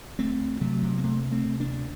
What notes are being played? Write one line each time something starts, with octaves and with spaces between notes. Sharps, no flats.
D2 A3 C4
D2
C3 F#3 A3
C3
A#3
C3 A3 C4
D2
A3 C4
C3
A#3 D4
D2